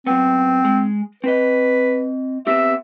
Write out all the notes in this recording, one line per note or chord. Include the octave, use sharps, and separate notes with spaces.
F#2 B3 C4
G#3
C4 B4 D#5
B3 C4 G4 E5